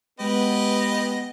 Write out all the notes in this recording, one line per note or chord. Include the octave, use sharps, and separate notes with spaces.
G#3 B3 G4 B4 D#5